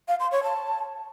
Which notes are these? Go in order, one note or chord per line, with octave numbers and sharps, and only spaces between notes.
F5
C6
C#5
A5